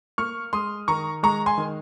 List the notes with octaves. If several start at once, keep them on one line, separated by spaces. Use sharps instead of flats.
A#3 C#6 F6
G#3 C6 D#6
D#3 A#5 C#6
G#3 A#5 C#6
G#5 C6
D#3